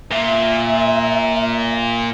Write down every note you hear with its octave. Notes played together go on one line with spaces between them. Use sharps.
A#2 E5